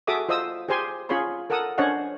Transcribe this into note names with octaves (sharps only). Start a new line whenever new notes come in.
F#4 G#4 A4 E5 D6 D#6
F4 C5 D#5 D#6 E6
G4 G#4 C5 G#5 C6
C#4 F4 G#4 C#5 B5 C6
A4 A#4 F#5 A5 D#6
C#4 D4 C5 C#5 D#5 F#5